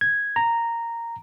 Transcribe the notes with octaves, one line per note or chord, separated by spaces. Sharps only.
G#6
A#5